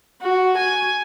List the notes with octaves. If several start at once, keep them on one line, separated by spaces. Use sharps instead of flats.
F#4
G#5